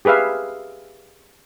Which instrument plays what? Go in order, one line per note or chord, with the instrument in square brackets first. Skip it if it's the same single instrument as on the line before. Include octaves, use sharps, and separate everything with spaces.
[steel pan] G4 G#4 B4 E5 F5